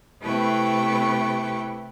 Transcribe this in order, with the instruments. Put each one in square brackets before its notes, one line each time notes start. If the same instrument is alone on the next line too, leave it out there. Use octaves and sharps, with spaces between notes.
[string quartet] C3 A3 E4 B4 G5 C#6